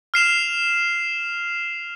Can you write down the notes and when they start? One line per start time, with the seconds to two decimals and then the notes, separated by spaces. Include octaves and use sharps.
0.14 F6 C7 E7 F7